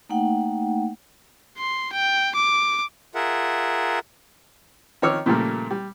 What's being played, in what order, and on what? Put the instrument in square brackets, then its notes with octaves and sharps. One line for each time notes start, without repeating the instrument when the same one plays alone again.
[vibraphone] A3 A#3 D#4 F#5 G5
[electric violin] C6
G5
D6
[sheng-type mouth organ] F4 G#4 A#4 E5 F#5
[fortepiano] D#3 F3 C#5 D6 E6 F6
A#2 C#3 F3 G3 A3 A#3
G3